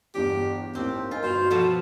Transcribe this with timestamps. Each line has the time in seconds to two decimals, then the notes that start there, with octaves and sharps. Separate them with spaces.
0.15 G1 E2 D4 G4
0.75 A1 D#2 C4 G4
1.11 D#4 F4 A#4 G#5
1.23 G1 F#4 B4 C5 F7
1.50 B2 F3 B3 A4